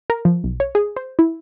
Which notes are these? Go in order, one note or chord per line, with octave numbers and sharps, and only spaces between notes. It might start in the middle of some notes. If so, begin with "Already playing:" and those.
A#4
F3
B1
C#5
G#4
C5
E4